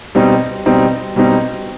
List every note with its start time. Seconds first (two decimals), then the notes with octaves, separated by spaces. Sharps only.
0.15 B2 G3 C4 D#4
0.66 B2 G3 C4 D#4
1.16 B2 G3 C4 D#4